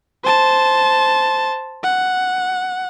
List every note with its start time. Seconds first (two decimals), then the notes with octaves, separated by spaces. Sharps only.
0.24 C5 A5
1.84 F#5